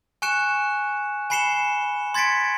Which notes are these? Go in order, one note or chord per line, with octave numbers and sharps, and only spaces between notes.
G#5 C#6 F#6 C#7 E7
G#5 B5 C7 C#7 E7 G7
C6 G#6 A6 B6 C#7 D7